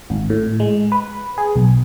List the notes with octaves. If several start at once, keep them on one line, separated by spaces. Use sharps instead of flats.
G#1
A2
G#3
B4
G#4
B1